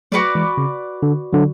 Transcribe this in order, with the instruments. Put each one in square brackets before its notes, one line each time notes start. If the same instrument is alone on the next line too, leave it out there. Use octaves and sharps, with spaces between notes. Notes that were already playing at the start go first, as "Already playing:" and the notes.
[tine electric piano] F#3 A3 [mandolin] F#4 B4 D5
[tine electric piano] E3 G#3
C#3
D3
D3 F#3